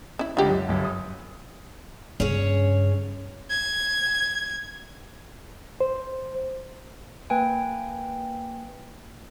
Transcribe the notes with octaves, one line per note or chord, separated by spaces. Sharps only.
C#4 E4
C#2 D3 F4 G4 F#5
F#2
G1 F#2
D#6
G2 C#3 C#4 G#4 C#5
G#6
C5
A#3 B4 G5 G#5